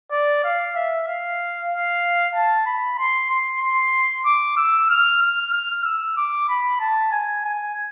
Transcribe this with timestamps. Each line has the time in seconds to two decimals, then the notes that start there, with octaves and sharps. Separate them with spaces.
0.12 D5
0.44 F5
0.76 E5
1.07 F5
1.71 F5
2.35 A5
2.66 B5
2.99 C6
3.30 C6
3.62 C6
4.25 D6
4.57 E6
4.90 F6
5.22 F6
5.53 F6
5.85 E6
6.17 D6
6.49 B5
6.80 A5
7.12 G#5
7.44 G#5